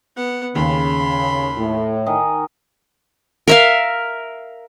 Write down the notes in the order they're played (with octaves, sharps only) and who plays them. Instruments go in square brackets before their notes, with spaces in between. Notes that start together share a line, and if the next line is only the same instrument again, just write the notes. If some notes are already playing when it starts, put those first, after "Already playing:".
[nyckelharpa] B3 F#5
[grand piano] D#2 [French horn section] C#3 [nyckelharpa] B5 C6
[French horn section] A2
[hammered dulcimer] D#3 D#5 G#5
[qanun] A#4 E5 F5